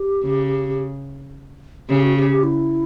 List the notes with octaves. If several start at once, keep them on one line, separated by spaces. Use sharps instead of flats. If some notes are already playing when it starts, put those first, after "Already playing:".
Already playing: G4
C#3
C#3 G4
F#4
G4
G4
E4